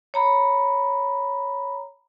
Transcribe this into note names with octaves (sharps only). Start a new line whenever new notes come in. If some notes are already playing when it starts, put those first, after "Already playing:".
C#5 A#5 B5